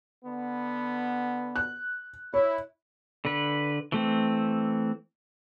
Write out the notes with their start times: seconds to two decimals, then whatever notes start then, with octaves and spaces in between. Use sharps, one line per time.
0.25 D3 B3
1.56 F#6
2.34 E4 C#5
3.25 D3 B4
3.92 E3 A3 C4